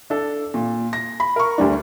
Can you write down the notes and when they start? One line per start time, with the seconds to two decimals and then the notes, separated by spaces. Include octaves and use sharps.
0.10 D4 A4
0.54 A#2
0.93 A#6
1.20 B5
1.36 A#4 C#6
1.58 D2 G3 D4